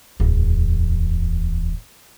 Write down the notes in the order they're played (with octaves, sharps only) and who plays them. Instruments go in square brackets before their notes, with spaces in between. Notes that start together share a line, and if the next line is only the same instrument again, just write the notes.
[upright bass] D1 E2